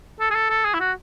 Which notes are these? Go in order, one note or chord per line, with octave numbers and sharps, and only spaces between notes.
A4
G#4
A4
A4
G#4
E4
F#4